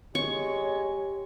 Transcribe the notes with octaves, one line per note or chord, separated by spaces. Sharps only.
G#3 G4 C#5 C#6